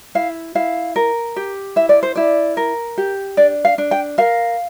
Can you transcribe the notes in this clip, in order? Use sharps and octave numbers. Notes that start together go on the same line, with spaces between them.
E4 F5
E4 F5
A#4
G4
E4 E5
D5
C5
E4 D5
A#4
G4
D4 D5
F5
D4
G5
A#4 F5